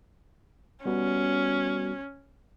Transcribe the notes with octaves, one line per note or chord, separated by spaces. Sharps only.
G3 B3 C#4 F#4